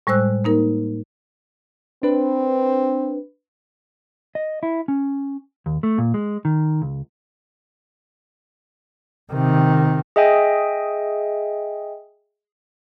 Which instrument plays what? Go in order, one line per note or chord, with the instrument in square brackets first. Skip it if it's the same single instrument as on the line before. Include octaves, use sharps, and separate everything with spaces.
[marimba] A2 G3 G#3 C5 E6 F#6
A#3 D#4 A#4
[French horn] C4 [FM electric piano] D4 B4
[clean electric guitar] D#5
E4
C#4
D#2
A3
A#2
G#3
D#3
C#2
[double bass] C3 D#3
[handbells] G#4 D#5 E5 G5 G#5